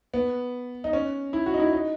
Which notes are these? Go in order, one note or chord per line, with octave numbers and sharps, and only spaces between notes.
B3
D#4
C#4
E4
F#4
D#4
E4
D#4